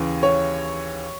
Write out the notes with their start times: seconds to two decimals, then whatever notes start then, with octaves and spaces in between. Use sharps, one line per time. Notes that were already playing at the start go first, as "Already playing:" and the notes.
Already playing: D#2 C#3 E3
0.23 C#5